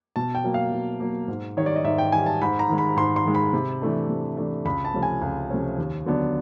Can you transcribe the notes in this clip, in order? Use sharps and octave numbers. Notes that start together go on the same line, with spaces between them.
B2 A5
G5
F#3 A#3
F5
B2
F#3 A#3
G#2
D#3 G3 C#5
D5
D#5
G#2 E5
G5
D#3 G3 G#5
A5
G#2 B5
A#5
D#3 G#3
B5
G#2 C6
C6
D#3 G#3
B5
C3
E3 A3 D4
C3
E3 A3 D4
C#2 B5
A5
C3 F3 A3 C#4
G#5
C#2
C3 F3 A3 C#4
D#2
D3 F#3 B3 D4